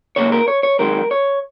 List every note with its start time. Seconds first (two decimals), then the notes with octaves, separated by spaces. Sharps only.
0.16 C#2 C#3 A#3 C#5
0.32 A#4
0.48 C#5
0.63 C#5
0.79 F#2 D#3 G#3 A#4
1.11 C#5